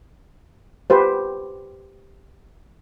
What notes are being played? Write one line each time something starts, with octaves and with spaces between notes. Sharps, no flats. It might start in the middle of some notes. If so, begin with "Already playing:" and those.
G4 B4 C5